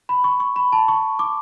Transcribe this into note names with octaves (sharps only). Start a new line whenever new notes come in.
B5
C#6
C#6
B5
A5
C#6
D6